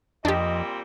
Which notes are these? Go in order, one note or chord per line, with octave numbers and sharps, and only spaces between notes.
F2 A#2 G3 C4 D4 G4 D#5